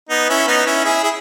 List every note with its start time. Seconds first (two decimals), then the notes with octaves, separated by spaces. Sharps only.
0.09 B3 D#4
0.29 C#4 E4
0.47 B3 D#4
0.66 C#4 E4
0.84 E4 G#4
1.03 E4 G#4